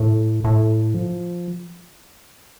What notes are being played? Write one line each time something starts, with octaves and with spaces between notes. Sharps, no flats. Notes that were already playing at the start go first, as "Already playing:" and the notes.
Already playing: A2
A2
F3